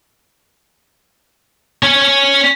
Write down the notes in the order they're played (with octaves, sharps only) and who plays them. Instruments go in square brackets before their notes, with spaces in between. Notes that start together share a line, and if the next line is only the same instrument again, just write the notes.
[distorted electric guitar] C#4 C#5